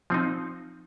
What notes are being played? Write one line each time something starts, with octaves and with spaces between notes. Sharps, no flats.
F3 C4 D#4